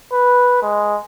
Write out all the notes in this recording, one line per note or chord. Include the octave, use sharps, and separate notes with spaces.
B4
G#3